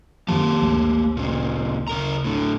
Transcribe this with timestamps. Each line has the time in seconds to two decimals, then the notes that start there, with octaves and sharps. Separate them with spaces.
0.28 F#2 D#3 F3 A#3 G4 A5
0.61 G#1 D2
1.17 A#2 C#3
1.88 C#3 A#4 A#5
2.24 A2 D3